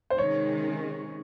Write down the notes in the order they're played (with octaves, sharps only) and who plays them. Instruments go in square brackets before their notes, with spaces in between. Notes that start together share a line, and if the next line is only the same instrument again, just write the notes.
[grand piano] C5
[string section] C3 D#3 G#3 C#4 [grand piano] C#5